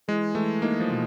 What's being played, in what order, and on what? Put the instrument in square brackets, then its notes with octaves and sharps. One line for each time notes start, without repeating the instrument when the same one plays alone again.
[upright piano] E3 [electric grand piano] G#3
[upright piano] E3 [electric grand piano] A3
[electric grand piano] A#3 [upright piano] D#4
[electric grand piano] F3
[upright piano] B2